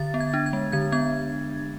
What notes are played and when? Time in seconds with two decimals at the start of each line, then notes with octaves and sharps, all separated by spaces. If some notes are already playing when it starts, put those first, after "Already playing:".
Already playing: D3 A6
0.14 B3
0.20 G#6
0.34 D4
0.46 G#6
0.53 G#3
0.72 D3 G#6
0.92 B3 G#6